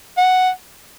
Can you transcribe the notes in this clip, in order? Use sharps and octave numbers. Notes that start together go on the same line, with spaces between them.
F#5